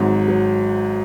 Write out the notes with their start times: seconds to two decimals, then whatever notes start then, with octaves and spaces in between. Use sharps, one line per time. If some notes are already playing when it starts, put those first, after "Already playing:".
Already playing: G#1 G#2 F#3
0.28 F#3